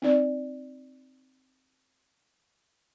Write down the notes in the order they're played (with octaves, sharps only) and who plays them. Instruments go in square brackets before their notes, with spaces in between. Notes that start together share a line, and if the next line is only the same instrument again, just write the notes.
[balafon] C4 D#4 D5